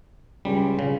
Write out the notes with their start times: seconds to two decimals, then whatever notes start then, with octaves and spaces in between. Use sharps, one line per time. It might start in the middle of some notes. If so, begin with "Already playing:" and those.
0.45 C#2 G3
0.79 C#3